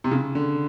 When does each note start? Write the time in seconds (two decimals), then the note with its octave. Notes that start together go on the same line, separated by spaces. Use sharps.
0.04 C3
0.11 C#3
0.35 D3